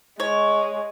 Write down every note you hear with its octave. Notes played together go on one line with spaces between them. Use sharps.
G#3 C#5